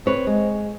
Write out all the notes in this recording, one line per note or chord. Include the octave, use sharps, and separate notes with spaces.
C4 B4 C#5
G#3